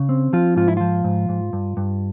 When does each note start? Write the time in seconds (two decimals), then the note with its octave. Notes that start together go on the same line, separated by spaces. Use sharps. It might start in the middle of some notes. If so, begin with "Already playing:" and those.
Already playing: C#3
0.09 C4
0.33 F3 F4
0.56 G#2 F4
0.68 E4
0.77 F3 F4
1.04 G#2
1.29 G#2
1.53 G2
1.77 G2